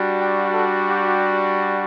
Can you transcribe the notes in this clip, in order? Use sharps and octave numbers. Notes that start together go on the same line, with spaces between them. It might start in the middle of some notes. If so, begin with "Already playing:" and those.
Already playing: G3 D4 F#4
G5
A4
G4